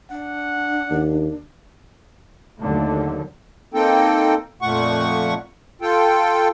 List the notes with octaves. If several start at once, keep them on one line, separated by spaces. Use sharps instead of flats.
D4 F#5
D#2
D#2 D3 F#3 A3
A#3 C4 D#4 A4 G5
F2 A#2 A3 F#5 C#6
F4 A4 G5